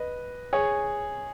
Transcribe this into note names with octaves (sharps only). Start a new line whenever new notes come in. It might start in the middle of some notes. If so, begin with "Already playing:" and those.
Already playing: B4 D#5
G#4 C#5